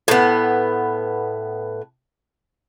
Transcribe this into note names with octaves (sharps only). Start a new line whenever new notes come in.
A2 B3